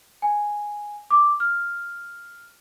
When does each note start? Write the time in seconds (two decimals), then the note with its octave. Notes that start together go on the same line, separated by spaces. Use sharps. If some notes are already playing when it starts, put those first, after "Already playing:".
0.22 G#5
1.11 D6
1.40 F6